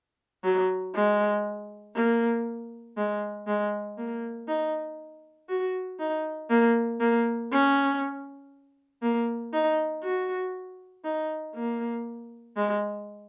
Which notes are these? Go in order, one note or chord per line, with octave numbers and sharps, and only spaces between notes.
F#3
G#3
A#3
G#3
G#3
A#3
D#4
F#4
D#4
A#3
A#3
C#4
A#3
D#4
F#4
D#4
A#3
G#3